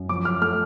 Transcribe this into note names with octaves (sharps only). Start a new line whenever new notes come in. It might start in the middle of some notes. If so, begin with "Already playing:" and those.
Already playing: F#2
F3 D6
F6
A3 F6